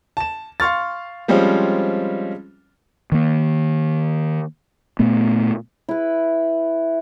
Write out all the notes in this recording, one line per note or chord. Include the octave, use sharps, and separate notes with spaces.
A5 E7
F5 C6 C#6 F6 A6
F3 G3 G#3 C4 C#4 F4
D#3 A#3
A#2 A3 B3
E4 B4